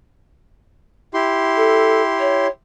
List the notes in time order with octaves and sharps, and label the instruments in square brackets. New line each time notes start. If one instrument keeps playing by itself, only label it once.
[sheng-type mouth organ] E4 G4 C6
[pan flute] A4
C#5